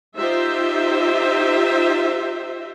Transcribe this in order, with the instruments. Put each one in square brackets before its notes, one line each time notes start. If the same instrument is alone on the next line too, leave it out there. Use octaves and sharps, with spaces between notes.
[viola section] D#4 F4 G4 C5 E5